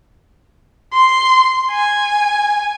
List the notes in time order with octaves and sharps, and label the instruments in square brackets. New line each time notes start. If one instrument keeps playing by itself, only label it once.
[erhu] C6
G#5